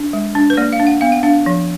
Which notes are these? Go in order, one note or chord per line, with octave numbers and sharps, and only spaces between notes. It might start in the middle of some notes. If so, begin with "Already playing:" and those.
Already playing: D4
G#3
D4
B4
A#3 D5
F5
D4
F#5
B3 F5
F#5
D4 F5
F3